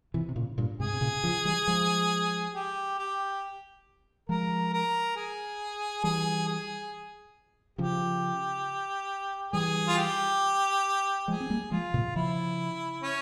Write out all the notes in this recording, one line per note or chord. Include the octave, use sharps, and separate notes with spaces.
C3 E3
C3
A#2 C#3
G2 A#2
G#2 C3 G#4
C3
A#2 C#3
C#3 F3
E3 G3
F3 G#3
G4
G4
F3 G#3 A#4
A#4
G#4
E3 G3 G#4
G#4
C#3 F3 G4
E3 G3 G#4
F4
G4
F3 G#3 G#4
C4
G3 A#3
F3 G#3 F4
A#2 C#3
C#3 F3 E4
C#4